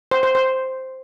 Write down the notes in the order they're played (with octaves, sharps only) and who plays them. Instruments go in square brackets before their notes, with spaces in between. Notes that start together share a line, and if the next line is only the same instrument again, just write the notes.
[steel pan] C5
C5
C5